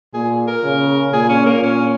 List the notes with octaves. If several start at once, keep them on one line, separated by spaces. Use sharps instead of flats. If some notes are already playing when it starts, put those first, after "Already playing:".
A#2 G#4
A#4
C#3
A#2 G#4
C#4
A#3
A#2 C#4